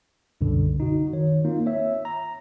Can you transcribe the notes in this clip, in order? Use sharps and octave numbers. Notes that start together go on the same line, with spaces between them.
C2 F#2 B2 D3
D#4 F#4
D#3 C#5
A#3 C4 D#4 F4
C#5 E5
A#5